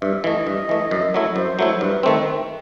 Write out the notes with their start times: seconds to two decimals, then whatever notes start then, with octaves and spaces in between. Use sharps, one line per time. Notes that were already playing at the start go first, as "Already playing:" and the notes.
0.01 G2 E5
0.24 E3 A3 D#5
0.47 G2
0.69 E3 A3
0.91 F#2
1.14 F#3 A3 E4
1.36 F#2 C5
1.59 F#3 A3 E4
1.81 G2 B4
2.03 D#3 A3 C4